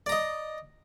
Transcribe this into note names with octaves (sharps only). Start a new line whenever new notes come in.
D5 D#5 A#5